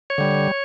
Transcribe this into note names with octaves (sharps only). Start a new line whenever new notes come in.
C#5
D3 G3